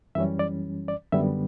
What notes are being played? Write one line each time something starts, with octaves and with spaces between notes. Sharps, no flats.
F#2 E3 G3 C#4 E5
D5
D5
F#2 D3 G3 B3 E5